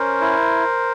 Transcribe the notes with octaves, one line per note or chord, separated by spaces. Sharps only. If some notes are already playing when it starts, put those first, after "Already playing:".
Already playing: C#4 A#4 C5
E4